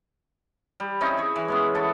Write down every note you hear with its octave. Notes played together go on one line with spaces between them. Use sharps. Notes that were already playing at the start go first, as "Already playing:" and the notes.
G3
C4 C#4 D#4 E4
G#4 C#5
E3 B4
G#3 B3 C#4
B3 E4 A4